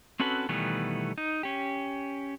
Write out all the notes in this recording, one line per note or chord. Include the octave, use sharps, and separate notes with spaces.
C4 C#4 F#4 A4 B4
B2 D#3 E3 G3 A3 B3
D#4
C#4 G4